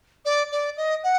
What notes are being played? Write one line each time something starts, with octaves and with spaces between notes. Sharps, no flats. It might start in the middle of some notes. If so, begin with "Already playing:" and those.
D5
D5
D#5
F#5